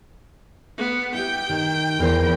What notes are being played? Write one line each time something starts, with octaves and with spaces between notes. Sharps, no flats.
B3
E4 G4 G5
D#3
E2 A#4 C5